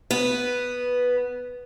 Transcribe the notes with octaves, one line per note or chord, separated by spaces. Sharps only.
B3 B4